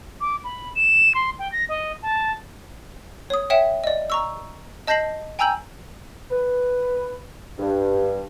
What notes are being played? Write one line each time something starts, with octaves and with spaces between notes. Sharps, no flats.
D6
B5
E7
C6
G5
A#6
D#5
A5
C#5 D#6
C#5 E5 F#5 G5 B6 E7
D5 D#5
A#5 C#6 E6
D#5 A5 G6 A#6 C7 F#7
G5 G#5 A#5 E6 G6 F#7
B4
G2